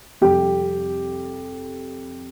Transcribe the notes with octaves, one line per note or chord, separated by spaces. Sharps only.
F2 C3 G3 G4